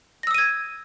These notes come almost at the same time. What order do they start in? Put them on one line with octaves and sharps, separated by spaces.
A#6 E6 D#6 D#7 G#6